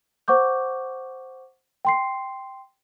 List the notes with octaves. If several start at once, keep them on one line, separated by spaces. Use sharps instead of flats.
C5 F#5 C#6 D6 G6
G5 C6 C7